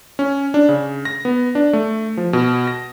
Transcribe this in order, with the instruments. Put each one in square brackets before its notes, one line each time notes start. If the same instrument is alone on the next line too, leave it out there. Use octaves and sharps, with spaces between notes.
[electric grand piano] C#4
D4
C#3
A#6
B3
D4
A3
F3
B2
A#6